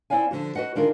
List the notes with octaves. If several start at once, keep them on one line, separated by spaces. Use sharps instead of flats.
C4 D4 E4 D5 F5 G#5
D3 F3 F#4
F#4 B4 D#5 F#5
D3 D#3 D4 F4 G#4 A#4